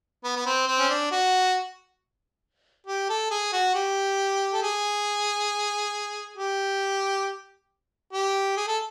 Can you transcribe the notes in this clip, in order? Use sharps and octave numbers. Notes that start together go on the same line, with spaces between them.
B3
B3
C4
C4
C#4
D4
F#4
G4
A4
G#4
F#4
G4
A4
G#4
G4
G4
G#4
A4